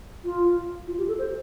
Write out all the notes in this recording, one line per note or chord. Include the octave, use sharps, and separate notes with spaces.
F4
F4
G4
A4
C5